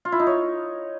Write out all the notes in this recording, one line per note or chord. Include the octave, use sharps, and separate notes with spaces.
F4
E4
D#4
C#5